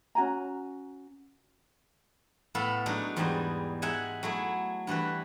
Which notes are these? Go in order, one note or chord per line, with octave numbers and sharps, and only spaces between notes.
C#4 F#4 G#5 A#5
A2 B3 A4 F5 B5
F#3 G#3 D4 D#4 F#4
E2 G#2 G3 D#4 C5 D#5
G#3 D#4 E5 F#5 G#5
F#3 A3 E4 G#4
G2 E3 F#4 B4